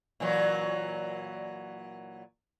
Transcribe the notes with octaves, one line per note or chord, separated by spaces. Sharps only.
A#2 E3 F#3